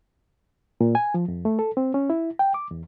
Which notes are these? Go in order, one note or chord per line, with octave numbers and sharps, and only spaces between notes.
A#2
G#5
F3
F2
A3
A4
C4
C#4
E4
G5
D6
E2